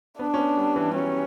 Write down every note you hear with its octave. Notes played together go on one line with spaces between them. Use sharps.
B3 D4
C#4
B3
G3
E3
G3
F#3 C#4